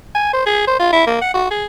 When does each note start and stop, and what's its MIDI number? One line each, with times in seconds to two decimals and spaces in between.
0.15 0.32 80
0.33 0.45 72
0.46 0.65 68
0.67 0.78 72
0.79 0.92 65
0.93 1.03 64
1.07 1.20 58
1.21 1.33 78
1.34 1.48 66
1.51 1.66 68